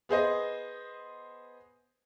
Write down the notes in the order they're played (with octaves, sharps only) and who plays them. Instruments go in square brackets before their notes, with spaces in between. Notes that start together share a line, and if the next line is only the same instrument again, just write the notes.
[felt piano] B3 G#4 C5 D#5